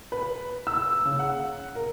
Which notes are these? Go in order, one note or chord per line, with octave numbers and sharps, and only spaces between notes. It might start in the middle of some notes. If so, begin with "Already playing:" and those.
B4
E6
C#3
F#5
A#4